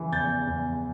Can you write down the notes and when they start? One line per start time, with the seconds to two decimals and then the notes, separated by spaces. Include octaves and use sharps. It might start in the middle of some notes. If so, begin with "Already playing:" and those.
Already playing: C#3 E3
0.12 E2 G6 A6
0.47 E2